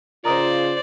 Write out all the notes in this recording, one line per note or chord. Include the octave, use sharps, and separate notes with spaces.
C#3 F4 A#4 C5 D5 D#5 A#5